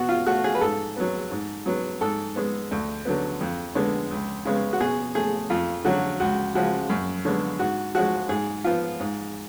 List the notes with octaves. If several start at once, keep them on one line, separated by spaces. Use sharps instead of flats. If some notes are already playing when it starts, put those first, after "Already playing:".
Already playing: B2 F#4
F4
A3 F#4
G#4
B4
G#2 A4
F#3 B3
G#2
F#3 B3
G#2 A4
G#3 B3
D2
D3 F#3 B3
F2
D3 G#3 B3
C#2
C#3 G#3 B3
F#4
B2 G#4
A3 G#4
F2 F4
D3 F#3 F#4
C#2 F#4
C#3 F3 G#3 F#4
F#2
D3 G#3 B3
G#2 F#4
F3 G#3 F#4
G#2 G#4
F3 B3 F4
G#2